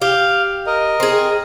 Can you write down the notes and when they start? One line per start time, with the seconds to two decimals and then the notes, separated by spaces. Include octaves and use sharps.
0.02 G4 F5
0.67 A#4 D#5
1.00 C4 G#4